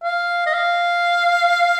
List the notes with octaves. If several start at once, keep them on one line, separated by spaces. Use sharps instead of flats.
F5
D#5
F5